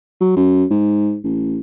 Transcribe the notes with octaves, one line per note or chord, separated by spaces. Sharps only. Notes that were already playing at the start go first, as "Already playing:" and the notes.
F#3
F#2
G#2
A1